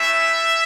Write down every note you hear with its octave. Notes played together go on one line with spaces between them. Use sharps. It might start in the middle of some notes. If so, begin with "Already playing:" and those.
Already playing: A3 C#4 E4 E5